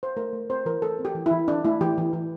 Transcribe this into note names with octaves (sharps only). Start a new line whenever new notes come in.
C5
A3 A#4
A3
C4 C5
E3 A#4
A3 A4
C4
G4
E3
E3 E4
C4 D4
A3 E4
E3 G4
E3
E3